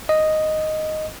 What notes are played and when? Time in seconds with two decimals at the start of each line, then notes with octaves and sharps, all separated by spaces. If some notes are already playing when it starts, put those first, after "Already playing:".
0.09 D#5